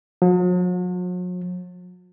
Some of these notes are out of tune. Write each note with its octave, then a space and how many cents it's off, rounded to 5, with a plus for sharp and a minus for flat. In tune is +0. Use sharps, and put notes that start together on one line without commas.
F#3 -45